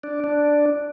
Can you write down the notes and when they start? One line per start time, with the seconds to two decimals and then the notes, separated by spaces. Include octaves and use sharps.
0.04 D4
0.24 D4